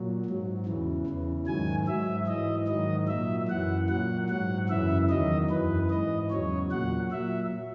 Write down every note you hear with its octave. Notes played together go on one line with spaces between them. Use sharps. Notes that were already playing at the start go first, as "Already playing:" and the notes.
Already playing: A#2 F#3
G#2 F#3
E2 C#3 E3
E2 C#3 E3
G#2 D#3 F#3 G#5
G#2 F#3 E5
G#2 E3 D#5
G#2 D#3 F#3 D#5
A#2 F#3 E5
F#2 E3 F#5
A#2 F#3 F#5
G#2 F#3 F#5
F#2 C#3 E3 E5
E2 D#3 F#3 D#5
F#2 E3 B4
G#2 E3 D#5
E2 C#3 F#3 C#5
A#2 F#3 F#5
A#2 F#3 E5